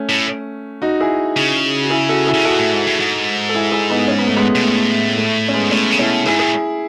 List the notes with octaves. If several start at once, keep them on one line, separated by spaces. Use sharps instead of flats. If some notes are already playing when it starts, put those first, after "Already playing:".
Already playing: A3 C#4
A2
D#4 F#4
E4 G#4
C#3
F#4
E4 G#4
F#4 A4
E4 G#4
C#3
B2 F#4 A4
A2
G#2
A2
G#2
A4
E4 G#4
E4 G#4
B3 D#4
C#4
B3
A3
G#3 B3
B2
A2
A3
C#4
G#3 B3
G#2
A2 A3 C#4
C#3
B2 C#4 E4
G#2 E4 G#4
A2 G#4